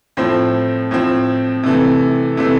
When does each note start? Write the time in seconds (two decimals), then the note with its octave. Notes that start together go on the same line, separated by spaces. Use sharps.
0.17 A2 F3 C4
0.91 A2 F3 C4
1.63 C3 E3 A3
2.37 C3 E3 A3